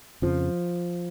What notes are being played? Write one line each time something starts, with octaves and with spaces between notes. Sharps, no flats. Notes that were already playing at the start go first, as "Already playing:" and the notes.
F2 C#3 F3